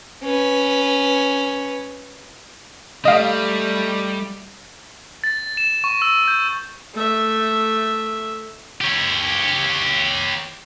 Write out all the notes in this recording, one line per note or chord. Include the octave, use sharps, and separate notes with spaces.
C#4 B4
G3 A3 D#4 G4 D#5 F5
A6
E7
C#6
E6
G6
A3 E5
G4 C#5